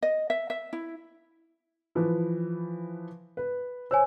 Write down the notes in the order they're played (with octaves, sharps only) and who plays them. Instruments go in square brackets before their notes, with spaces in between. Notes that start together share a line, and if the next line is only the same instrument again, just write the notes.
[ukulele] D#5
E5
E5
E4
[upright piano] E3 F3 B4
B4
[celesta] C5 C#5 G#5 [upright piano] E6